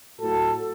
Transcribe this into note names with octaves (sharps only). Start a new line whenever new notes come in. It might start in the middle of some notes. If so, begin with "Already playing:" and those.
A2 F#3 F#4 A4